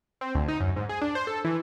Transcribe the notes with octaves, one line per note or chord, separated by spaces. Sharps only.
C4
D2
D#4
F#2
G#2
G#4
D4
C5
A4
E3